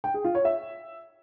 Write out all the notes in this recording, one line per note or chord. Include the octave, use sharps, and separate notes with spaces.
G5
G#4
F4
C#5
E5